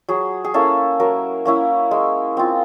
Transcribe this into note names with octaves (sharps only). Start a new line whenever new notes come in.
F#3 G#4
G#4
A#3 C#4 E4 A4
F#3 A#4
A#3 C#4 E4
G#3
C4 F4